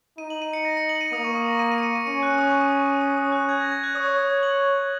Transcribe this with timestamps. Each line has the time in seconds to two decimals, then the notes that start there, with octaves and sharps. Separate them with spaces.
0.18 D#4 D#7
0.30 F#7
0.42 D#7
0.53 C#7
0.65 A#6
0.77 C#7
0.89 F#7
0.95 C#7
1.01 D#7
1.12 A#3 D#6
1.24 C#6
1.36 D#6
1.48 A#6
1.59 D#7
1.72 D#7
1.78 C#7
1.83 D#7
1.95 D#7
2.07 C#4 C#7
2.23 F#6
2.38 D#6
2.50 C#6
2.61 D#6
3.01 D#6
3.17 D#6
3.32 F#6
3.49 G#6
3.60 A#6
3.72 G#6
3.84 F#6
3.95 C#5 D#6
4.43 F#7